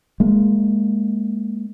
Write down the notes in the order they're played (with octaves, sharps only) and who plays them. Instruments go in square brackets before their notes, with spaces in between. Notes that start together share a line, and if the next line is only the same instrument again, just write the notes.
[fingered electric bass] G#3 A#3